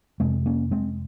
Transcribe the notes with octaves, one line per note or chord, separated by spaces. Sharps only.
F2 C3 G#3 C4
A#3 C#4
G#3 C4